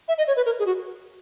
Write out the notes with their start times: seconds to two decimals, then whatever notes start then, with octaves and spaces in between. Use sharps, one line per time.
0.08 E5
0.18 D#5
0.28 C#5
0.37 B4
0.46 A#4
0.59 G#4
0.66 F#4